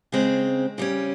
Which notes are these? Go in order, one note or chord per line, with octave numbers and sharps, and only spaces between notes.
C#3 G#3 C4
C#3 G3 C#4